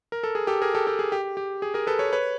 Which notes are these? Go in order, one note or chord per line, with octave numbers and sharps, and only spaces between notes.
A#4
A4
G#4
G4 A4
G#4 A#4
G4 A4
G4 A4
G#4
G4
G4
G#4
G#4 A#4
A4 B4
B4 C#5
B4 C#5